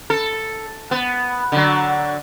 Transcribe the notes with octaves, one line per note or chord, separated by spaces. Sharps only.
A4
B3
D3 F#3